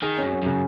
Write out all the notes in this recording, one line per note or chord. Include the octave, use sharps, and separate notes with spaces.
D#3 G#4
F#2 C#4
C#4
F#2 C#3